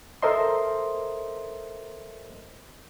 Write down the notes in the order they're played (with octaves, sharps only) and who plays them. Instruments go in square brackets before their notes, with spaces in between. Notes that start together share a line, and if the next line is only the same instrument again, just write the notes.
[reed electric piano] A4 A#4 C5 D#5 E5 C6